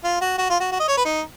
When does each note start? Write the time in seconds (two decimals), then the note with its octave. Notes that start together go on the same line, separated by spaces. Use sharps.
0.04 F4
0.21 F#4
0.38 F#4
0.50 F4
0.60 F#4
0.71 F#4
0.80 D#5
0.88 C#5
0.97 B4
1.05 D#4